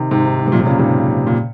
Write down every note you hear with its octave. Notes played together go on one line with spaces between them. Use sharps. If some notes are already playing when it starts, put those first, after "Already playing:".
Already playing: C3 D#3
G#2 C3
G#2
G#2
C3
F#2 A#2
C3
A#2 C#3
G#2 C3
A#2